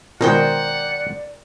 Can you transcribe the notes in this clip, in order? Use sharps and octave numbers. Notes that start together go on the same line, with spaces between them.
B2 D#3 G#3 A#4 C5 D5 F#5 G5